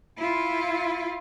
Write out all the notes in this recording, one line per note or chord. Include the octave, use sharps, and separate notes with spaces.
E4 F4